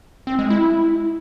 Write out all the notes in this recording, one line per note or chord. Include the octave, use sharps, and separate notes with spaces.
C4
G#3
E4